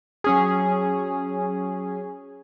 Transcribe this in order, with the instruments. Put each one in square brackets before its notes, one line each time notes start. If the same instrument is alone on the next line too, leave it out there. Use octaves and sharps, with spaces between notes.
[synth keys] F#3 C#4 G#4